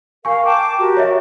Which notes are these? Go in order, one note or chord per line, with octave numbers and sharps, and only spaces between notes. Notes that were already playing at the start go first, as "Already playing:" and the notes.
A#4 F5 G#5 C#6
G5 A5 D6
F#4 G4 A#4
C#5 D#5 E5